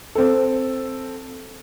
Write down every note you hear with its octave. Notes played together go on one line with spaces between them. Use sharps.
C4 A4